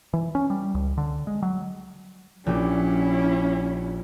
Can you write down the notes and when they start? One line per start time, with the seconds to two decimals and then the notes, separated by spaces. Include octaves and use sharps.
0.13 E3
0.35 C#4
0.50 G3
0.74 C#2
0.98 D3
1.27 G#3
1.43 F#3
2.46 A#1 C#4 E4 G4
3.19 D7